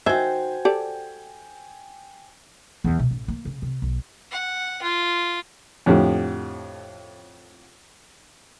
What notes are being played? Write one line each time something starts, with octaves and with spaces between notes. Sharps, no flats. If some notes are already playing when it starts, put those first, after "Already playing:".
D#3 F#4 C5 E5 G5 G#5 G#6
G4 A4 D5
E2
B2
A1
A#3
C#3
C3
B1
F#5
F4
F2 A2 D3 G4